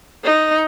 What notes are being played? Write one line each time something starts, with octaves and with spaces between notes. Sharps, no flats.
D#4